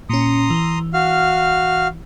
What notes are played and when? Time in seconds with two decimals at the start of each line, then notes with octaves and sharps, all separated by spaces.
0.10 A#2 C#4 A#5 C6 D#6
0.50 E3
0.93 F#4 F5 F6